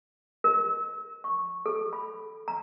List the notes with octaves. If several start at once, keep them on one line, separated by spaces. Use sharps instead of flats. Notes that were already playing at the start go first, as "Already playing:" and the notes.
A#4
C#6
A4
B5
A#5